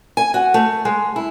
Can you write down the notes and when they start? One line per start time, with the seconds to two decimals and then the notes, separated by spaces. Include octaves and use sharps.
0.17 G#5
0.34 F#4
0.54 A3
0.85 G#3
1.16 E4